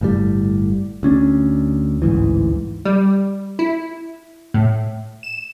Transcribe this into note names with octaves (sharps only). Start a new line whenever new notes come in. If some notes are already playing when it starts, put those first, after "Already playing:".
G1 A2 C#3 G3
D2 C#4 D4
A1 D2 G#2 E3
G3
E4
A2
E7